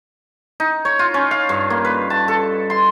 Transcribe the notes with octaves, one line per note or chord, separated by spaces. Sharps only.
D#4
C#5
F4
C#4
F5
G2
A#3
B4
A5
A4
C6